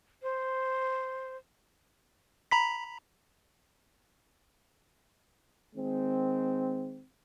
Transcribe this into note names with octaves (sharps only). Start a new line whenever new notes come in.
C5
A#5 B5 B6
D#3 G#3 C4